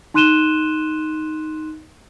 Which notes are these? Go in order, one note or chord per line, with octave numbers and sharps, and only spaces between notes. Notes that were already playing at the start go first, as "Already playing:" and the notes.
D#4 C6 F#6 D#7 E7 G7